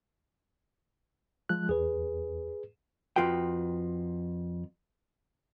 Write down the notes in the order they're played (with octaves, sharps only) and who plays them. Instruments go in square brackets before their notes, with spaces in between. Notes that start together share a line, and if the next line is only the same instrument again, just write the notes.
[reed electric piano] F3 G#3 F#6
[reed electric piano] E2 [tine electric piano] G#4 B4
[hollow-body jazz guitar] F2 F4 F#4 B4 G5